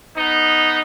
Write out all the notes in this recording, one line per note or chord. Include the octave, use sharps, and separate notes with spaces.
B3 D#4